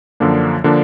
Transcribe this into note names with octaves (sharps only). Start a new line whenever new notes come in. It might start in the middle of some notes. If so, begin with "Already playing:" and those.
F#2 D3 F3 A#3 D4
D3 F3 A#3 D4